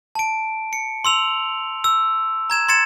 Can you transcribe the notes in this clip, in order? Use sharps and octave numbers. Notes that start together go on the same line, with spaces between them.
A5 D7
C#7
C6 E6 F7 F#7
E6
A#5 G#6 E7
C6 G#6 A6 C#7 E7